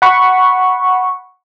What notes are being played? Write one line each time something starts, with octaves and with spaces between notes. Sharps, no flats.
F#5 B5 C#6